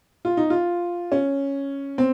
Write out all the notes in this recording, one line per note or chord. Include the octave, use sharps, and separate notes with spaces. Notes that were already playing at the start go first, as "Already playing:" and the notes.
F4
D#4
F4
C#4
C4